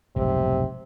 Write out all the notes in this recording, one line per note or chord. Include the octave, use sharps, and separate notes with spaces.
F1 B1 G#2 C3